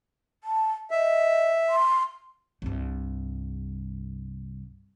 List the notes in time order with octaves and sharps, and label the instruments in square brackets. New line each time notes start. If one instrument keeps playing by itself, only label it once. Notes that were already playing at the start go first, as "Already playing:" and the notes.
[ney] A5
[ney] D#5 [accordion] E5
[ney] C6
[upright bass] C2 G2